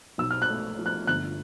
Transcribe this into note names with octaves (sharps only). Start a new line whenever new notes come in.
B1 E6
F6
F#6
A3
F3
F#6
G1 F#6